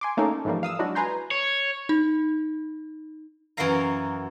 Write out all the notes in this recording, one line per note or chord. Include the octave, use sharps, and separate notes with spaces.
G#5 C6 D6
A3 A#3 C#4 D#4 A4
G#2 E3 F3 G3 A3 A#3
F5 D#6 E6
F#3 G#3 D4 E4 F#4
B4 G#5 A#5 C6 G6
C#5
D#4
F#2 E3 F#4 A#4 F5 A#5